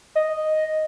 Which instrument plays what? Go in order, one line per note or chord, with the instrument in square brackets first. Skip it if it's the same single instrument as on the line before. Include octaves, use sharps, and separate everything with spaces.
[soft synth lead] D#5